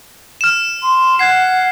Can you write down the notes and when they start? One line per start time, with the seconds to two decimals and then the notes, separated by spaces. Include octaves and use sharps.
0.41 F6 E7
0.83 C6
1.19 F#5 G#6 C7